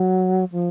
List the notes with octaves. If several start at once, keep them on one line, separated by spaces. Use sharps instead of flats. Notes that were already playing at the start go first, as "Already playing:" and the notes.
Already playing: F#3
F3